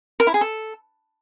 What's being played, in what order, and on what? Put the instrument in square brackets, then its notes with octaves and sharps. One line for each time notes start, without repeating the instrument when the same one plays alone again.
[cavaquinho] A#4
E4
G#4
A4